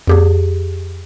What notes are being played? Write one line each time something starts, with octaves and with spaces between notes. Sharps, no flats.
F2 G4 G#4